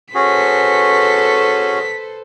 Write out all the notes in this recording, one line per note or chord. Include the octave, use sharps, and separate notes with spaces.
C#4 F#4 G#4 A4 B4 C5 B6